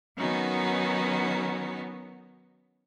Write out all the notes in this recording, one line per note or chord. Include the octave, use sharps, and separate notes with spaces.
D#3 F#3 B3 C#4 D#4 F#4